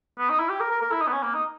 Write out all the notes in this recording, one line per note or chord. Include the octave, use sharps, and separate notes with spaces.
B3
D#4
E4
G4
A#4
A#4
A#4
E4
D#4
B3
C#4
A#3
D#4